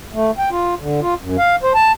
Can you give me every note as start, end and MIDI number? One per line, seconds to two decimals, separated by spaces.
0.13 0.31 57
0.38 0.49 79
0.51 0.75 65
0.79 1.00 50
1.01 1.14 65
1.21 1.37 42
1.38 1.56 77
1.63 1.73 72
1.74 1.92 81